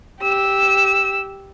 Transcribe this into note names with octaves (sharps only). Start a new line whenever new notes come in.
G4 E6